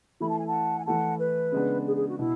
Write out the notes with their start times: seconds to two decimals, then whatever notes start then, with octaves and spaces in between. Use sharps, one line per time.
0.20 E3 A3 E4 B5
0.29 A5
0.38 G#5
0.47 F#5 A5
0.79 G#5
0.86 E3 A3 E4 F#5 A5
1.19 B4
1.52 C#3 G#3 B3 D4
1.86 G#4
1.97 G#4
2.08 F#4
2.18 B2 E4